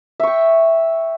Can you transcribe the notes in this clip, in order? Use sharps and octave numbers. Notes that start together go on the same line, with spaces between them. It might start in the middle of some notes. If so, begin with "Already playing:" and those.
E5 G5 C#6